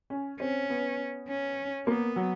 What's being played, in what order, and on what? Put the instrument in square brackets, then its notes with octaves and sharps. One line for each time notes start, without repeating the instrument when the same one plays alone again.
[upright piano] C#4
[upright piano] C4 [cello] C#4
[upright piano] B3
[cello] C#4
[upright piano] A#3 [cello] B3
[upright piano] F#3